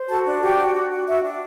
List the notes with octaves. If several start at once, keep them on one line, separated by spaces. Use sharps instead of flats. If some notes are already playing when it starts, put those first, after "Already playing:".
Already playing: C5
F#4 A4 A5
D4
F#4 G4 G5
F#4
F#4
F#4
F#4 E5
D4